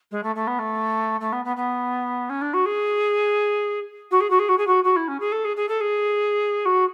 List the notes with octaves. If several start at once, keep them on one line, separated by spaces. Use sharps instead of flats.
G#3
A3
A3
B3
A3
A3
B3
B3
B3
C#4
D4
F#4
G#4
F#4
G#4
F#4
G#4
F#4
G#4
F#4
F#4
E4
C#4
G#4
A4
G#4
G#4
A4
G#4
F#4